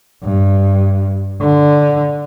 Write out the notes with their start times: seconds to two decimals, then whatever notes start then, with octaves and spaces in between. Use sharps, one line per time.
0.24 G2
1.42 D3